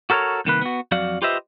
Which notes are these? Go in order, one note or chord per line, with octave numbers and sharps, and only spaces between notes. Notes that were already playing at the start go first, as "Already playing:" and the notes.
F#4 A4 A#4 C5 C#5
C2 D#3 A#3 B4
B3 F#4
F2 F#3 F#4 D5 F5
F4 G4 B4 C5 D#5 E5